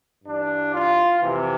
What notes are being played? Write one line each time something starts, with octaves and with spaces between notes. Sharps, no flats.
G2 E3 D4
F4
F2 C3 E3